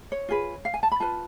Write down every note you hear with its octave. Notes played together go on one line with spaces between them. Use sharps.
C#5
F4 G#4 B4
F5
G#5
A5
B5
F4 B4 A5